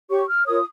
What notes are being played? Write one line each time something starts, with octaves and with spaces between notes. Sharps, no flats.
G4 C#5 C#6
F6
F4 A#4 C#5 D#6